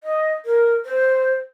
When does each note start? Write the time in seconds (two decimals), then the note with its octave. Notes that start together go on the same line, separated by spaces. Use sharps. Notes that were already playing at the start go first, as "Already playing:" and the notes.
0.04 D#5
0.45 A#4
0.85 C5